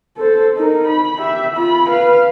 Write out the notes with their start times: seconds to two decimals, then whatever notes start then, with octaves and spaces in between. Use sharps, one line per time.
0.17 A4 C5
0.57 D#4 A#4
0.87 B5
1.19 G4 E5
1.55 F4 B5
1.89 B4 F5